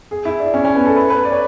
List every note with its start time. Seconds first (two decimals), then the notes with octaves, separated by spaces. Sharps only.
0.11 G#4
0.25 E4
0.40 D4
0.54 C#4
0.65 C#4
0.75 B3
0.86 A4
0.97 B4
1.10 B4
1.25 D5
1.32 C#5